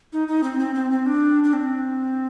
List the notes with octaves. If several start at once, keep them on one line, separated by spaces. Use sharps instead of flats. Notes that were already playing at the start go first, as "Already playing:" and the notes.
D#4
D#4
C4
C4
C4
C4
D4
D4
C4